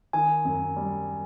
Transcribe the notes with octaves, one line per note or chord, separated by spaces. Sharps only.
D#3 G#5
F#2
G3